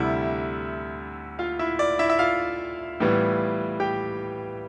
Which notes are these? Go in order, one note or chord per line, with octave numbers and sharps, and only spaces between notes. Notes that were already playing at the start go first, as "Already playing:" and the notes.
Already playing: D2 C3 G3 E4 E5
F4 F5
E4 E5
D5
E4 E5
E5
F4 F5
A2 E3 G3 B3
G4 G5